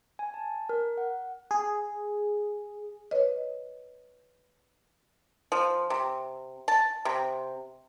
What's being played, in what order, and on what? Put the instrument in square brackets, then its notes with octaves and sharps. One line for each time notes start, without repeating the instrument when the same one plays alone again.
[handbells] G#5
A5
A#4
F#5
[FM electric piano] G#4
[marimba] B4 C#5 D#5
[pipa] F3
C3
A5
C3